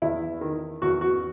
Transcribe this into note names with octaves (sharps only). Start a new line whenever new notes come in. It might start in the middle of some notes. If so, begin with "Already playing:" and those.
E2 E4
D#3
E2 F#4
F#4